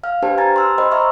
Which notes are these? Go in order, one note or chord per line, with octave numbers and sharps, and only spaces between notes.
F5 F6
D4 G4 B4 C5 G5 A5
G#5 A#5 G#6 A6
C6 E6 F6
C5 D#5 G5 B5 C6
D#5 E5 A#5 C#6 E6 F6